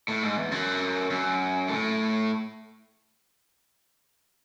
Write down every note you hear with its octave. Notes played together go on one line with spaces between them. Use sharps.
A2
G#2
E2
F#2
F#2
A2